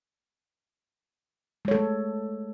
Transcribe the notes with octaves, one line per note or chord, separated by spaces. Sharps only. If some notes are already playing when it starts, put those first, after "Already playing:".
G#3 A3 A4 C#5